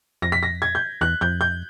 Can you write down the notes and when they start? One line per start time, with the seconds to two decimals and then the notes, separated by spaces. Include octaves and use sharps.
0.22 F2 A#6
0.32 B6
0.43 A#6
0.62 G#6
0.75 G6
1.01 E2 F#6
1.21 F2 G6
1.41 G6